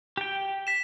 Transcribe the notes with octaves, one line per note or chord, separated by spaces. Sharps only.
G4 G5
B6 E7